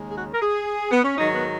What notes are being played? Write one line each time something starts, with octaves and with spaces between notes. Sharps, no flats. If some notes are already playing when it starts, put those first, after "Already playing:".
Already playing: D#2 C#3 G#3
G#4
F#4
A#4
G#4
B3
C#4
G#2 D#3 F#3 D#4
B3